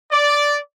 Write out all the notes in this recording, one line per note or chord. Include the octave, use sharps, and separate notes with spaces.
D5